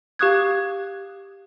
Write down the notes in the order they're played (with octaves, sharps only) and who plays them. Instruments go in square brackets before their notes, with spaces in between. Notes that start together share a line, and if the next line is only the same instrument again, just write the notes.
[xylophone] G4 F5 C#6 D#6 F#6 G#6